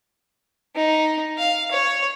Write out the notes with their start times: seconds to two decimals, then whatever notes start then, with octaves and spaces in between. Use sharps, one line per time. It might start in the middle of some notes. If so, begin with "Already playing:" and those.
0.76 D#4
1.38 F5
1.71 C#5